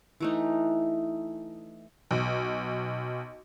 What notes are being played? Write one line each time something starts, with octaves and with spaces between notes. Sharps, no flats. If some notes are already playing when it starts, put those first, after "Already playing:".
E3 A3 D#4
B1